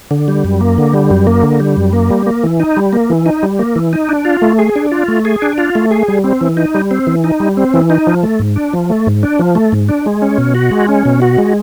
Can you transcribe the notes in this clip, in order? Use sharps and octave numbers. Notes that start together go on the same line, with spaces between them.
D3
G3
F#2
A#3
D3
G3
F#2
A#3
D3
G3
F#2
A#3
G3
A#3
E3
D#4
G3
A#3
E3
D#4
G3
A#3
E3
D#4
D4
F4
A3
G#4
D4
F4
A3
G#4
D4
F4
A3
G#4
G3
C4
E3
D#4
G3
C4
E3
D#4
G3
C4
E3
D#4
F3
A3
G#2
D4
F3
A3
G#2
D4
F3
A3
G#2
D4
G#3
C#4
B2
F#4
G#3
C#4
B2
F#4
G#3